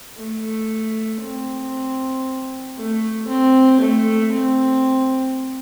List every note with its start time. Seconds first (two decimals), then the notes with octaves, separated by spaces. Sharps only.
0.18 A3
1.22 C4
2.77 A3
3.28 C4
3.80 A3
4.32 C4